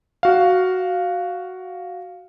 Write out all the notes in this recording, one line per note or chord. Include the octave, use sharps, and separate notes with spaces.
F#4 F5